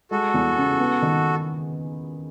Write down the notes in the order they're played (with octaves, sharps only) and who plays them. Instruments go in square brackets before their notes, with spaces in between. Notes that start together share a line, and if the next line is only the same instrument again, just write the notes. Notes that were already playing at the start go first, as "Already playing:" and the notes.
[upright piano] G#3 [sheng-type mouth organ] F#4 A4
[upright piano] E2
C#3
B3
D#3